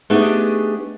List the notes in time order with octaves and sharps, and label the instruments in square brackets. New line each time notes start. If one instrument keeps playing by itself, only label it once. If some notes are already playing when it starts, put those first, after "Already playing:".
[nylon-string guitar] A3 B3 D4 D#4 G4 G#4